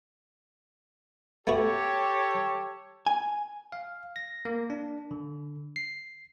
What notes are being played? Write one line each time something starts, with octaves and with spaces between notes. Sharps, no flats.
A3 B3 F#4 G4 A4 C#5
G#5
F5
A#6
A#3
D4
D3
C7